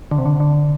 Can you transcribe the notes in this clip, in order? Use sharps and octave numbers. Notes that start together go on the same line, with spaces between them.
D3
C3
D3
D3